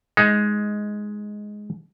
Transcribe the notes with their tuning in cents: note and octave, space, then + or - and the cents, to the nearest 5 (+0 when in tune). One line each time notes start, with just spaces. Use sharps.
G#3 +5 D#4 +15